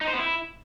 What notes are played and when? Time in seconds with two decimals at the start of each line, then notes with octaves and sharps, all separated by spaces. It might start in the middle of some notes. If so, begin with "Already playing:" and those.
0.01 D#4
0.07 C5
0.13 B3
0.20 E4